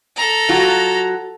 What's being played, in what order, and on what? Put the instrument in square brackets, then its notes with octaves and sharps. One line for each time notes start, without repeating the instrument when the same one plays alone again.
[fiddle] A4 A#5
[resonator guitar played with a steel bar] F#3 F4 F#4